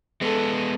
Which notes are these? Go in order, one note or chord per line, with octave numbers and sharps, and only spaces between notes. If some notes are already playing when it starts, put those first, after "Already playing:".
G#3 B3 A4